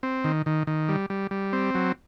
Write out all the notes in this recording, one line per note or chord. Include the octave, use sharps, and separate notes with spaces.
C4
D#3
D#3
D#3
G3
G3
G3
C4
F#3